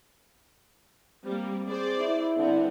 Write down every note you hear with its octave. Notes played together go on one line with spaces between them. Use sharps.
G3 A#3 C4
G#4 C5 D5
E4
D3 G3 B3 C4